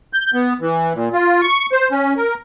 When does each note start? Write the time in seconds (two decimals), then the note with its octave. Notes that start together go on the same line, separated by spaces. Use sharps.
0.13 G6
0.34 B3
0.61 E3
0.94 A#2
1.13 F4
1.41 C#6
1.72 C5
1.91 C#4
2.17 A#4